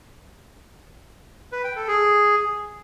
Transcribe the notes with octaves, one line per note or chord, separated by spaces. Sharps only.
B4
G5
A4
G#4